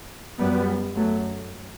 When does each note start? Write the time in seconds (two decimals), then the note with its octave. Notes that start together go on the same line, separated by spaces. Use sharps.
0.39 F#2 G3 B3
0.96 F#2 F#3 A3